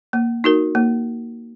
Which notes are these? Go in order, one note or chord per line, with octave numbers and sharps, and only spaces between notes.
A#3
D#4 F#4 A#4
A#3